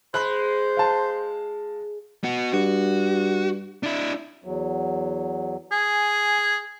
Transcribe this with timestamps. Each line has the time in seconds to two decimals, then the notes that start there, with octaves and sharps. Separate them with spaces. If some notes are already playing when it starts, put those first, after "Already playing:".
0.14 G#3 C5 B5 F#6
0.77 F5 A5
2.24 B3 F#4
2.54 G2 F#4
3.83 D4 E4
4.44 E2 F#3
5.72 G#4 G#5